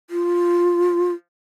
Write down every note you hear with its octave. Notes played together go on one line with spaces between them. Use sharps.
F4